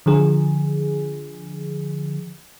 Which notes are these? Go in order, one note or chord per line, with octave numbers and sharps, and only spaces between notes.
D3 F3 G#4